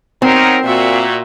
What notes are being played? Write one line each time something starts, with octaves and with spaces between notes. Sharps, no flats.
F#3 C4 D#4 A#4
A#2 F#4 E5